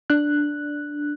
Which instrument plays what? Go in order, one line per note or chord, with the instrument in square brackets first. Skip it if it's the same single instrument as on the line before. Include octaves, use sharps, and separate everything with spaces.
[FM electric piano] D4 F#6